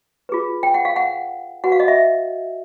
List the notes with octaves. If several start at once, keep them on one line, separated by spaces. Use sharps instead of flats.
F4 G#4 B4
G5
F#5
F5
F#5
F#4 B4 F#5
F5
D#5
E5